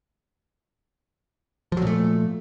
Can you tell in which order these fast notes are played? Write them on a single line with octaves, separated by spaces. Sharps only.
F3 F#3 A#2 A3